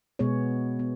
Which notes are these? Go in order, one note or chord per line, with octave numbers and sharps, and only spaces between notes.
B2 G#3 B3 G#4 C#5
B3